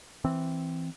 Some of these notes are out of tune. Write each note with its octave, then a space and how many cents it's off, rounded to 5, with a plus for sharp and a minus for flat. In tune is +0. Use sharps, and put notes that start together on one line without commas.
E3 +0 C4 +0